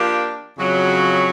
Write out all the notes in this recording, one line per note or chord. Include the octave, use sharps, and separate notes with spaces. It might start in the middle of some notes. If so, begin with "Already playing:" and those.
Already playing: F3 A#3 D4 G4
F2 C#3 F#3